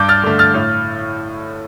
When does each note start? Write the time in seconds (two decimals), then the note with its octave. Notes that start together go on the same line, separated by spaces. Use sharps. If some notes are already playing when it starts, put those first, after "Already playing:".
Already playing: G2 D6 G6
0.08 F6 A6
0.24 D3 A3
0.39 F6 A6
0.54 A2